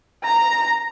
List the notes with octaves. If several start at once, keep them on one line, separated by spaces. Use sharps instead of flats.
A#5